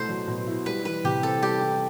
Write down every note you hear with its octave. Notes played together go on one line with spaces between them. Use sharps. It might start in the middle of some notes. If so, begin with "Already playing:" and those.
Already playing: B2 A3 E4 C5
F#3
B2
E4
G3 B4
E3 B4
C3 G4
C4 A4
G3 G4
E3